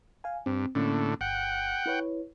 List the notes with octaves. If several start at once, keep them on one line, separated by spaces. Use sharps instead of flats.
F5 G#5
G2 C4
A2 D3 A#3 C#4
G1 F#5 G5
E4 B4 C#5